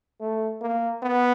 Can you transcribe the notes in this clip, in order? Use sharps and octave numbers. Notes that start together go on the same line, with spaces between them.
A3
A#3
B3